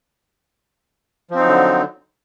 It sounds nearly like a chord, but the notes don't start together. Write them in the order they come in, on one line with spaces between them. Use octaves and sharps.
F3 C4 D#4 F#3 D3